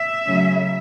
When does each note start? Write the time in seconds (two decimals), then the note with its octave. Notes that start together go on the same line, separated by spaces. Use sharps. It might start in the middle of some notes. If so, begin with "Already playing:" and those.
Already playing: E5
0.27 C#3 F#3 A3 C#4